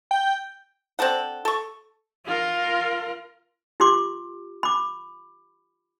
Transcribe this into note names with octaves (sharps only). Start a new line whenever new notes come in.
G5
C4 D4 A4 F#5
A4 C#6
F4 A#4
F4 G4 C6 D6
B5 D6